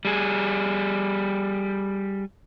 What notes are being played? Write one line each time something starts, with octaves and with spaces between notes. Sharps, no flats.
G3 G#4